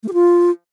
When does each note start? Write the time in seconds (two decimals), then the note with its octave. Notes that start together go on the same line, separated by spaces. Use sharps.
0.03 A3
0.08 G4
0.13 F4